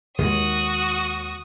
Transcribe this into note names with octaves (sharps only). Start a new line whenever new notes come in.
D#2 D#3 G#3 F#4 D#6